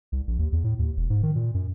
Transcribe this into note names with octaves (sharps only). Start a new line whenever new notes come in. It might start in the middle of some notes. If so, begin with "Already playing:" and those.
C2
A#1
D#2
E2
A2
D#2
E1
G#2
D#3
A#2
F#2